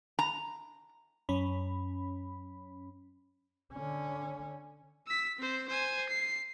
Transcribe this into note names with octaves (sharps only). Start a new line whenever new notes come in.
A#5
F#2 C#4 B5
D3 C#4
E6 B6
C4 C5
C5 G#5
C7